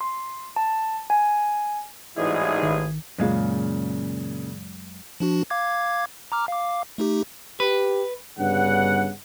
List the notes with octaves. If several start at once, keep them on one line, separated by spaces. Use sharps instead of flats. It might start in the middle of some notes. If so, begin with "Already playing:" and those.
C6
A5
G#5
A1 G#2 E3 F#3 G3 D#4 E4 G#4
G#1 D#3
F#2 A#2 C#3 G#3 F5
F3 D4 F#4
F5 D6 G#6
A#5 D6 F6
F5 D6
A3 D#4 G4
G4 B4
G1 G2 C#3 F#5